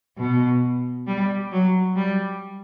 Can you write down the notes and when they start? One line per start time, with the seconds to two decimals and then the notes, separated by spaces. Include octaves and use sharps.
0.17 B2
1.07 G3
1.52 F#3
1.96 G3